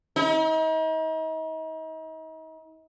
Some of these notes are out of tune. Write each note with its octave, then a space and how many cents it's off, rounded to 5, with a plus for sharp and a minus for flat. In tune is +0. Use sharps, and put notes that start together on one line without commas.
D#4 +40